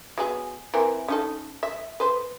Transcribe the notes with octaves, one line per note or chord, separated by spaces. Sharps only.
F#3 B3 G#4
E3 C4 A#4
C#4 D#4 A4
E5
B4 C5